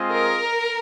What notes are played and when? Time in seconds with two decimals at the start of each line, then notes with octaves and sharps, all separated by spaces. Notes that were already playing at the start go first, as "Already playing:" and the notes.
Already playing: G#3 C4 F4 G#4 D#5
0.11 A#4